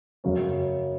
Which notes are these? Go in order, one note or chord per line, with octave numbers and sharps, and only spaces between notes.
F#2 C#3 F#3 C#4